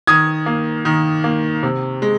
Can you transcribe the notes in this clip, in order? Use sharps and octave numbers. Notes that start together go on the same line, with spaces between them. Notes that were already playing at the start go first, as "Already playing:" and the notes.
D#3 D#6 G#6
A#3
D#3
A#3
C3
G#3